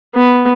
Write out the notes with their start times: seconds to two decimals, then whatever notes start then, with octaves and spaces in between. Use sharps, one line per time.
0.15 B3